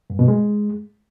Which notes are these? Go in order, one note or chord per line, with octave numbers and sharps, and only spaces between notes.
G2
B2
G#3